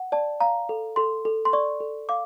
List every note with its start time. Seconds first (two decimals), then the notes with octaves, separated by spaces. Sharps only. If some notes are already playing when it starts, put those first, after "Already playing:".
Already playing: F#5
0.12 D5 A5
0.40 F5 A#5
0.69 A4
0.96 A4 C6
1.25 A4
1.45 C6
1.53 D5 C#6
1.80 A4
2.09 F5 D6